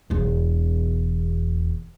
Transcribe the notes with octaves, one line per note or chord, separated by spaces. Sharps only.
E1 E2